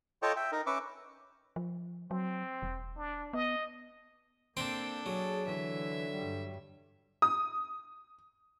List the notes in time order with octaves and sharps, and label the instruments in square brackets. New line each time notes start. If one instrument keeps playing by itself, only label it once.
[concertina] F4 A4 C#5 D#5 G5 C#6
E5 G5
D#4 A#4
C#4 B4 E5 C#6 D6
[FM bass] F3
[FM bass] F#3 [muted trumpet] C4
[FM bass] E1
[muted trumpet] D4
[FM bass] B3 [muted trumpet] D#5
[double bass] A#3 [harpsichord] C4 G5 C6 [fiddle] D4 A4
[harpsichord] F#3 [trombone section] G#4
[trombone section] D3 [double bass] E3 [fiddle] E5
[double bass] G2 G3
[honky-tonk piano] D#6